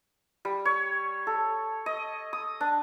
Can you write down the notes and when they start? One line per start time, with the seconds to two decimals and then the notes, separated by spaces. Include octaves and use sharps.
0.45 G3
0.65 C#5
1.27 A4
1.86 D#5
2.33 D#6
2.61 D4